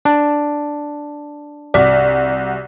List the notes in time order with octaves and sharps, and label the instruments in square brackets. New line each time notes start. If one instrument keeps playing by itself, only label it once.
[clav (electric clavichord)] D4
[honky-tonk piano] C2 F#4 B6 [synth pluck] D5